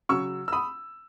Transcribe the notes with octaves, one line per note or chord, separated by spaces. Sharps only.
C#3 F#3 C#4 C#6 E6
E6
B5 D#6